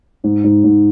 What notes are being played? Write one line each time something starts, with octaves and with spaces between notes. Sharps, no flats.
G#2
G#2
G#2